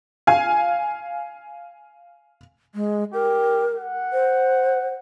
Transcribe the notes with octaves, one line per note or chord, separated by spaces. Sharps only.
F5 G#5
G#3
G4 A#4
F#5
C5